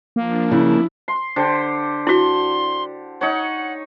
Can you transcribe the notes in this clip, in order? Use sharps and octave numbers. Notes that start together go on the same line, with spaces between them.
F3 A#3 D4
C#3 E4
C6
D3 G4 C5
E4 F#4 C6
D#4 C#5 F#5